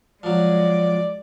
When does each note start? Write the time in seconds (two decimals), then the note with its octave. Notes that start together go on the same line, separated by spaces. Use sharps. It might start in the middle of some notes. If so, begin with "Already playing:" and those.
0.23 F3 F#3 G#3 D5